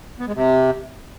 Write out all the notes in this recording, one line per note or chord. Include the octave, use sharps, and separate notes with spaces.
B3
G#3
C3